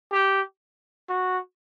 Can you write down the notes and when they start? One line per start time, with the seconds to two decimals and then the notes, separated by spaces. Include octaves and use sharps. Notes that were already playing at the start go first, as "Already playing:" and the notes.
0.12 G4
1.09 F#4